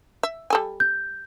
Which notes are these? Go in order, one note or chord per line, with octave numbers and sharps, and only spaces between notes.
E5
G3 A4 G#5
G6